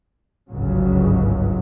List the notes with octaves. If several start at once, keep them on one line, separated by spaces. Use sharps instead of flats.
G1 C#2 G#2 C#3 F#3